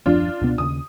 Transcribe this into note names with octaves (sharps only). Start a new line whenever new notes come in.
D#1 F#2 F3 D4 F4
C#2 B2 B3
D#2 C#3 D#6